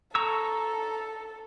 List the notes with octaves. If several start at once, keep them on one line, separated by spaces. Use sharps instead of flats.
A4 A#5 C#6 E6